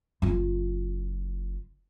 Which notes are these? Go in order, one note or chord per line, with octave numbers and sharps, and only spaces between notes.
F#1 F4